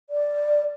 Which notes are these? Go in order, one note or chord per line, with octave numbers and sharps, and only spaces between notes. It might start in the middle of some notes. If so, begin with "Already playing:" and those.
D5